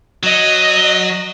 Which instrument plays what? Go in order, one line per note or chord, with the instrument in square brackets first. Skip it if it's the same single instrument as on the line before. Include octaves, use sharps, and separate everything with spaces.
[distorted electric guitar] F#3 [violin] D#5